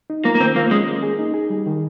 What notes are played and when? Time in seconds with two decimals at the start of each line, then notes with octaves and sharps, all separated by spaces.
0.10 D#4
0.24 A#3 F4
0.35 A#3
0.40 D#3 C4
0.56 A#3 F4
0.71 G#3 C#4
0.88 A#3
1.03 G#4
1.19 D#4
1.34 G#4
1.50 G3
1.66 D#3